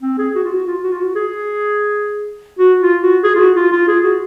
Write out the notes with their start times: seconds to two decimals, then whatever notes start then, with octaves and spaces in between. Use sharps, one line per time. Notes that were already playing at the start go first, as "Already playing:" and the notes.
0.02 C4
0.18 G#4
0.35 F#4
0.45 F4
0.51 F#4
0.67 F4
0.84 F#4
0.92 F4
1.00 F#4
1.15 G#4
2.59 F#4
2.82 F4
3.03 F#4
3.24 G#4
3.36 F4
3.40 F#4
3.56 F4
3.72 F4
3.88 G#4
4.04 F#4